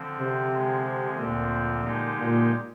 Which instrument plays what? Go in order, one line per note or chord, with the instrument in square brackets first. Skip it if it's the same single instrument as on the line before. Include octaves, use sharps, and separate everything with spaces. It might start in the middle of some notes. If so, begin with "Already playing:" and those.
Already playing: [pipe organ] D3 F3 C4
[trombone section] C3
[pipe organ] D3 F3 G#3
[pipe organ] D2 D3 F3 C4 [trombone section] A#2
[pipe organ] D3 F3 G#3 D#4 G4
[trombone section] A#2